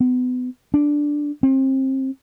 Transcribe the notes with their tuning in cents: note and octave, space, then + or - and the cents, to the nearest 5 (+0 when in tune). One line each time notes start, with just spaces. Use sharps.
B3 +30
D4 +0
C4 +30